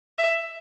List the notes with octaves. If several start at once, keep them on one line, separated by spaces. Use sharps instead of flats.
E5